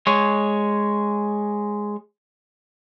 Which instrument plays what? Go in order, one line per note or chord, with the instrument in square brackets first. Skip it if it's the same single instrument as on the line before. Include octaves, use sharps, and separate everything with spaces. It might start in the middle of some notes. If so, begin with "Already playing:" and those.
[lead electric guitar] G#3 C#5